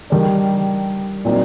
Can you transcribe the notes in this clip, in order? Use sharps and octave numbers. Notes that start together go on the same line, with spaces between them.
D#3 G3 D4
A#2 F#3 C4 D#4